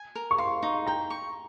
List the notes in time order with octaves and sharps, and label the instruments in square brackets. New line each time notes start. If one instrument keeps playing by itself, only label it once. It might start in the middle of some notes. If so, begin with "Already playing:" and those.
Already playing: [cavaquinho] G#5
A#4
[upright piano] C#6
[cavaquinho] F5 [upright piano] C6
[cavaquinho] D#4
[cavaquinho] G5 [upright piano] A#5
[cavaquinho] C#6